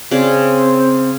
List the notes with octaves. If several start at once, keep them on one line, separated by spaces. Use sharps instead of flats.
C#3 C4 D5